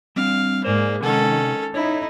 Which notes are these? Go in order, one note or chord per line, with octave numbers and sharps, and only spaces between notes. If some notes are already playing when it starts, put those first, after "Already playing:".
G3 C4 D4 F5
G#2 A#3 G#4 C5 D5 G#5
C3 D#3 G#3 C#4 A4 F#5 G#5
D#4 E4 C#5 D5 E5